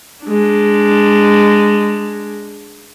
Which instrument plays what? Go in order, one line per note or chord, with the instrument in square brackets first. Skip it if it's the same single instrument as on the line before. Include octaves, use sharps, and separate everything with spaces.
[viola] G#3 D4